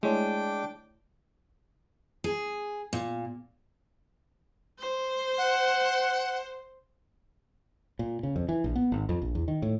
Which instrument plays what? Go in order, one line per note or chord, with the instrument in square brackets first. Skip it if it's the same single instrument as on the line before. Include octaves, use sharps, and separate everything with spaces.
[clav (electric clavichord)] G#3 [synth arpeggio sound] A3 E4 C#5 [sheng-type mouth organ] D4 G5 D6
[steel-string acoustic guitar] G#4
A#2
[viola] C5
[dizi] F#5
[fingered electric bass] A#2
C#3
F2
E3
A#1
B3
G#1
F2
A#1
E2
D#3
A2